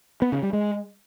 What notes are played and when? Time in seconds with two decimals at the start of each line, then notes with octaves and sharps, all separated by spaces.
0.22 B3
0.32 C#3
0.43 G3
0.53 G#3